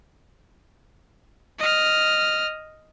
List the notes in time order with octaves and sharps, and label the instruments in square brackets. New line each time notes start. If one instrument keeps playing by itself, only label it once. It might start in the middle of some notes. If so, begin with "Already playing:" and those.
[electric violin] D#5 F6